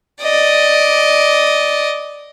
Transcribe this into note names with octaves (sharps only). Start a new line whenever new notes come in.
D5 D#5